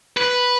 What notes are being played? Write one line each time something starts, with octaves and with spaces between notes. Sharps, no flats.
B4